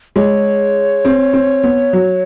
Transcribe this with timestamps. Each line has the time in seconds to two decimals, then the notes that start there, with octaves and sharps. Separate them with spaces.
0.16 G#3 C#5
1.05 C4
1.33 C4
1.64 B3
1.93 F#3